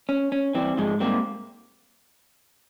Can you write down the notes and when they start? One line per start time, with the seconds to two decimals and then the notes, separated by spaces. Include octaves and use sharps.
0.09 C#4
0.32 C#4
0.55 E3 G3 C4
0.77 G#2 F3 G#3
1.00 G3 A#3 C4